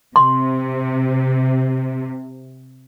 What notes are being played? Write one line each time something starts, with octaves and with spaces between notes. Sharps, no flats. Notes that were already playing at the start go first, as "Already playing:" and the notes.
C3 C6